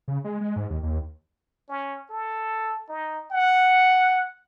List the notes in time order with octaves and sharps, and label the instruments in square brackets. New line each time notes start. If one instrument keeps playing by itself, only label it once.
[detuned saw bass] C#3
G#3
G#3
G#2
D#2
D#2
[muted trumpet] C#4
A4
D#4
F#5